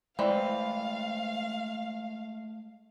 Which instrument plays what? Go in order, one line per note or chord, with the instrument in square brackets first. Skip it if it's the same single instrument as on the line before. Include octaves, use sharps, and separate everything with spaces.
[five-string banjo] E3 C4 [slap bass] G#3 A3 [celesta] C5 D5 C6 [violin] F5